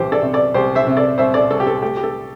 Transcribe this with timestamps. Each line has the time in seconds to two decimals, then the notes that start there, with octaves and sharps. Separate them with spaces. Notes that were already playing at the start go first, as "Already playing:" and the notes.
Already playing: C2 E3 G4 C5
0.12 A4 D5
0.22 C3
0.33 A4 D5
0.54 C2 G4 C5
0.75 C5 E5
0.87 C3
0.97 A4 D5
1.18 C2 C5 E5
1.34 A4 D5
1.50 C2 A4
1.60 G4
1.67 A4
1.82 A3 G4
1.97 G4
2.03 A4